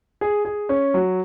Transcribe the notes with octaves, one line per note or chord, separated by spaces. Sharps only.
G#4
G#4
C#4
F#3